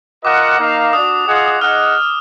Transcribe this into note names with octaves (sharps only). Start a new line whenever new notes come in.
F4 A#4 D#5 F#5 D6
A#3 D#4 A#4 F5
D4 F#4 D5 D#6
F4 G#4 D#5 F#5
D#4 G#4 D#5 F#5 F6